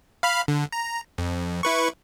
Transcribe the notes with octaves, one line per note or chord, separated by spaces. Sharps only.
F5 B5 F6
D3
A#5
F2
E4 B4 C#6